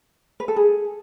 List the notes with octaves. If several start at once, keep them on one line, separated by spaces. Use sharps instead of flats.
B4
A4
G#4